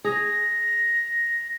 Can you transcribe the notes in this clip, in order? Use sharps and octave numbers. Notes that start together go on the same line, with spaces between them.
G#4 A#6